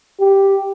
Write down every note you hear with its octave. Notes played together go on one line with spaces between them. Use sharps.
G4